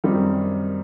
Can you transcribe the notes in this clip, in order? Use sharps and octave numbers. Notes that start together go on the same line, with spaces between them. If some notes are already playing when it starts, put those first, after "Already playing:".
F#2 D#3 G3 C4 D#4